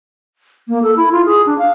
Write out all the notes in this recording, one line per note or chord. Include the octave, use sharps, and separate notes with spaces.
A#3
A4
E4
F4
G#4
D4
F5